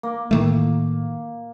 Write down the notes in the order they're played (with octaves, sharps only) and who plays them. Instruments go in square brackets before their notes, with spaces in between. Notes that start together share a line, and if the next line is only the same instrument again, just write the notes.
[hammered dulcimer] A#3
[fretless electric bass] A2 D#3 A3